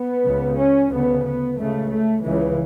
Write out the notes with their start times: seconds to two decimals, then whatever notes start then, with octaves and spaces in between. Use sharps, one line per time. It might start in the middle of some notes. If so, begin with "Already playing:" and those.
Already playing: B3
0.26 C#2 C#3
0.59 C#4
0.92 D2 C#3 B3
1.26 B3
1.58 C#2 C#3 A3
1.92 A3
2.25 C#2 C#3 E3